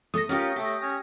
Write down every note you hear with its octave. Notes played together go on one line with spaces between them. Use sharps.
A3 D#6 A#6
C#4 F4 G4 A#4 C#5
A3 G4
C#4